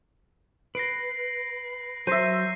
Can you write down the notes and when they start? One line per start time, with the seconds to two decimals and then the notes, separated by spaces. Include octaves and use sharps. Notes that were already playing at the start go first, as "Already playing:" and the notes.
0.75 B4 A#6 C7 D7
2.07 F#3 C5 E5 A#6 C7 D#7